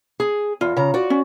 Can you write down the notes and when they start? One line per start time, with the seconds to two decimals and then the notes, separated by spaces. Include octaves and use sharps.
0.20 G#4
0.61 E2 F4
0.76 C#3 A#5
0.94 F#4 D5
1.10 C#4